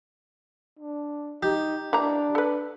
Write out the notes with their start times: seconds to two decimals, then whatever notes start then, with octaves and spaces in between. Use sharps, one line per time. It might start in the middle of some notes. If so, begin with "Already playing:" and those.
0.79 D4
1.43 D#4 G4
1.93 E3 A#3 D4 A#5
2.35 A4 B4